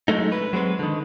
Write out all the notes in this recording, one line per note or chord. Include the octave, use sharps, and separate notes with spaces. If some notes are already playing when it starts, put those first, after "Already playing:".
F#3 G#3 A3 D#4
B4
F#3 G#3 C4 B4
D3 D#3